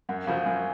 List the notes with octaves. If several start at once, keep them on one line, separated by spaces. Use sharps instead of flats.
F#2 F#5
C#3 F3 F5
F#2 G#5